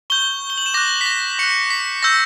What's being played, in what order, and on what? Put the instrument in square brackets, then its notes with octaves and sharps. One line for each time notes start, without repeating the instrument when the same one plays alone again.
[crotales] C#6 G6 G7
G7
F#7
E7
D6 F#6 A#6
B6
A#6
C#6 F#6 C#7
B6
C#6 E6 G6 A#6